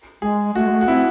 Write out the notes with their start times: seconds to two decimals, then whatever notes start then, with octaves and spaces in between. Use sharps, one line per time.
0.22 G#3 G#4
0.55 A3 F#4
0.67 G#3
0.71 A3
0.81 F#4
0.87 C4 E4